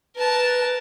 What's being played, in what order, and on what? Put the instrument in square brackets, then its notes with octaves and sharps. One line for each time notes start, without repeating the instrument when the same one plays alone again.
[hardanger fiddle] A#4 A5 [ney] B4